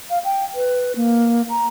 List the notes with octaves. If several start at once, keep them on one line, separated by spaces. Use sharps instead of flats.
F5
G5
B4
A#3
A#5